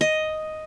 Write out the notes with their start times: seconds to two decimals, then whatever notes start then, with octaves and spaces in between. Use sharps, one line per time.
0.01 D#5